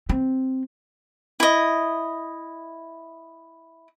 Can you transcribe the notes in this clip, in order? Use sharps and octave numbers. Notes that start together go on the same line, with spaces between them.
C4
E4 D#5